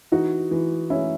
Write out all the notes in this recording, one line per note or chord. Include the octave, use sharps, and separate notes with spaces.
E3 D#4 F#4
E3
E3 C#4 E4